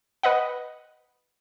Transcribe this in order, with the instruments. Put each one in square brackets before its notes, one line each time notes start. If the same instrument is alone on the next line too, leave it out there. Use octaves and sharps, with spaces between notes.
[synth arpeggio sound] B4 D#5 F#5